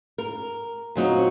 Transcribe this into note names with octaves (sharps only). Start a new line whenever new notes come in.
A#4
A#2 F#3 C4 D#4